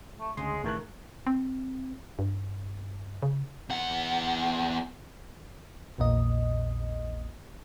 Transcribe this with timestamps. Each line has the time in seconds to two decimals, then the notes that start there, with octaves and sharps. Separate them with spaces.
0.20 A3
0.37 D2 C#3 G#3 D#5 C6
0.64 A1 A2 D#3 E3 A3 A#4 F#6
1.27 C4
2.19 G2
3.22 C#3
3.70 E2 F#5
5.98 A#1 E2 A#2 D#5